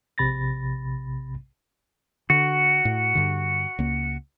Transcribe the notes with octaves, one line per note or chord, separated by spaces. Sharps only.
A#1 C3 B5 A6 A#6
D3 F#4
A2
G2 D3
C#2 A#3